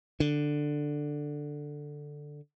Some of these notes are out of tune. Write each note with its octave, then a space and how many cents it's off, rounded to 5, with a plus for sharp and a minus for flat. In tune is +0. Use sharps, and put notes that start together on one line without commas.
D3 +5